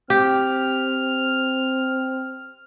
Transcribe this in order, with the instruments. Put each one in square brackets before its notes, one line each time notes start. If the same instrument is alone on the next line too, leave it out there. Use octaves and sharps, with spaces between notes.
[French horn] C4 [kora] G4 [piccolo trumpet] F6